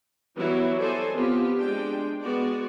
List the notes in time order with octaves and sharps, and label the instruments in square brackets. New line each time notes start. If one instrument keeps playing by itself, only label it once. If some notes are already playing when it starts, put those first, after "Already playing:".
[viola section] E3 F#3 G3 B3 E4 F#4
A4 C5 D5 D#5 G#5
F3 B3 C4 F4 G4
G#3 D4 G5
G#3 B3 F#4 D5